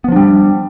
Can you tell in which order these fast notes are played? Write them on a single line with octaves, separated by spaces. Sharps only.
B3 F3 D4 G3